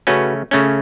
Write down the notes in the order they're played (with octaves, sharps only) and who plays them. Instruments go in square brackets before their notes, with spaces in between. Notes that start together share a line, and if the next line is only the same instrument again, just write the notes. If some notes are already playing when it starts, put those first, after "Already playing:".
[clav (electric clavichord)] C#3 A3 C#4 F#4 B4
C#3 A3 C#4